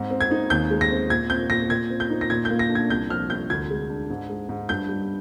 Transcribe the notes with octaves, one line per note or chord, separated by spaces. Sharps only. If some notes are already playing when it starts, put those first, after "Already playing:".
Already playing: G#2 C4
C4
G#6
D#4
D#2 G6
G#3
A#6
C4
A#2 G#6
C4 G6
A#2 A#6
A#2 G#6
C4
G6
D#4
A#6
A#2 G#6
G6
A#3
A#6
D4
G#6
C2 G6
F3 F6
C2 G6
D2 G#6
G#3
D4
G#2
G#3
G#2
G2 G6
G3